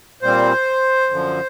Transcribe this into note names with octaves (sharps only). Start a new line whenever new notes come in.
A#2 G3 C4 C5
F#2 D3 F3